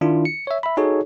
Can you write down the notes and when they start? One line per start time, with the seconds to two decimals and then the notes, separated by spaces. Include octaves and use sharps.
0.01 D#3 D4 E4 F4
0.25 C#7
0.47 C#5 E5
0.63 E5 B5
0.77 D#4 F#4 G#4 A4 C#5